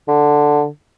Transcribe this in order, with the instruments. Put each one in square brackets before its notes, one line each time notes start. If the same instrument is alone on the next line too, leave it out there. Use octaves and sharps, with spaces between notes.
[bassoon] D3